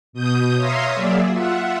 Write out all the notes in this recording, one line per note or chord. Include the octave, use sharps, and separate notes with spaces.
B2 D#6 G6
C#5 E5 F5 A#5 C6 D#6
F#3 A#3 G#4 D5 E5
F4 E5 F#5